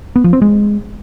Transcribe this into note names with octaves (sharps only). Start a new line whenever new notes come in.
B3
F3
C4
G#3